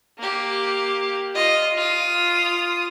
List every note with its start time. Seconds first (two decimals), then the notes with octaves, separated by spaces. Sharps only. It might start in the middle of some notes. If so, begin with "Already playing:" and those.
0.19 A#3 G4
1.34 F4 D#5
1.77 F4 D#6